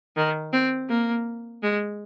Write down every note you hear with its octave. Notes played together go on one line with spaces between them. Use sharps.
D#3
C4
A#3
G#3